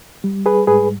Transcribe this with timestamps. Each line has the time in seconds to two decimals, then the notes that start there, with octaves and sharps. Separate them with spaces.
0.24 G3
0.46 G#4 B4
0.67 G#2 G#4 B4